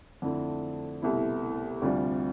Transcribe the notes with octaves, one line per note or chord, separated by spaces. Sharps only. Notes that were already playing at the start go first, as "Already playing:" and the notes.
F2 D3 A3 E4
C2 B2 A3 E4
D2 C3 G3 D4 F4